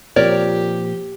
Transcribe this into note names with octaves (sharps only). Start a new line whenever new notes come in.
A#2 F3 C4 G4 A#4 C#5 D5